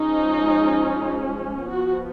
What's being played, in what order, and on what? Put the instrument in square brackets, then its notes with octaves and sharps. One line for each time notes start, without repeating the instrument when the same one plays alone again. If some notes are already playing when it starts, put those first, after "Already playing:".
Already playing: [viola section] F3 G#3 C#4 D#4
F3 B3 F#4